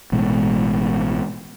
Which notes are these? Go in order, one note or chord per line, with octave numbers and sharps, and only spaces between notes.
A1 B2 G#3